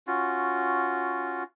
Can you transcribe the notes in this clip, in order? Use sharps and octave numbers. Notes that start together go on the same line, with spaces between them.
C#4 F4 F#4